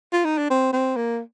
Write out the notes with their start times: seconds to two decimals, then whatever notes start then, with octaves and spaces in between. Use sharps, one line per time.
0.12 F4
0.25 D#4
0.38 D4
0.50 C4
0.73 C4
0.96 A#3